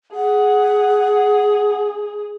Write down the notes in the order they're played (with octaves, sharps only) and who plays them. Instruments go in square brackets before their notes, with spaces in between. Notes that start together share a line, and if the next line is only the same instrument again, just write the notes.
[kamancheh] G#4 [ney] F#5